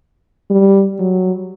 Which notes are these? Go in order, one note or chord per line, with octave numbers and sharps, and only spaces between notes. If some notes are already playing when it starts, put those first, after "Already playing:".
G3
F#3